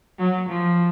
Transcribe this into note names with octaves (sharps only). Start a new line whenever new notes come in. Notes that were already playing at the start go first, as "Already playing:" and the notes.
F#3
F3